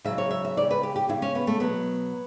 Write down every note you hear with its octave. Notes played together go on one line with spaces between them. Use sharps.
C#3 F#3 E5
C#5
E5
E5
C#3 G3 D5
B4
G4
G4
C#3 G3 E4
C#4
B3
A3
B2 F#3 B3